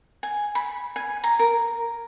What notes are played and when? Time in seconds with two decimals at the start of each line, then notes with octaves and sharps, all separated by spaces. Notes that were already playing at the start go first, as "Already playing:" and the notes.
0.23 G#5
0.55 B5
0.96 G#5
1.24 A#5
1.39 A#4